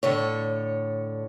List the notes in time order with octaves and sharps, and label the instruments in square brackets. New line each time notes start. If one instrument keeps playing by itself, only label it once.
[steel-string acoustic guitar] A2 D3 C#5